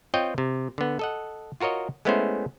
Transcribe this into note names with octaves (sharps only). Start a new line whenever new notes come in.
C4 F4 C#5 D#5 G5
C3
D3 B3
A4 D#5 F#5
F4 F#4 A#4 C#5 D#5
G#3 A3 B3 C#4 E4 C5